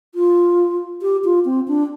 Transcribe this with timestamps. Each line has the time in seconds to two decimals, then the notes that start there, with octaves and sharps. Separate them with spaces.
0.15 F4
1.02 G4
1.24 F4
1.45 C4
1.68 D4